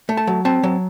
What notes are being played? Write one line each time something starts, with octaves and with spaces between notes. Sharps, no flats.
A3
A5
F#3
C4 A5
F#3